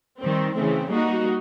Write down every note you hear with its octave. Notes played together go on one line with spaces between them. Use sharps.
D#3 G3 C4
C#3 E3 A3 C4
G3 A#3 D#4 F#4